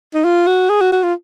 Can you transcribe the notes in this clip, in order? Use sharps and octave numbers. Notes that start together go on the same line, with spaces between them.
D#4
F4
F#4
G#4
F#4
F#4
F4